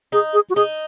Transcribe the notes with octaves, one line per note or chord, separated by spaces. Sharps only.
D#4 G#4
G#4
F#4
D#4 G#4